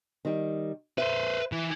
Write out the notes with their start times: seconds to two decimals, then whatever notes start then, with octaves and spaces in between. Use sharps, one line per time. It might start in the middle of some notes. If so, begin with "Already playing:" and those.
0.25 D#3 G3
0.98 B4 C5 E5
1.52 E3